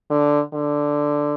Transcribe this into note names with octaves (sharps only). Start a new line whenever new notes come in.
D3
D3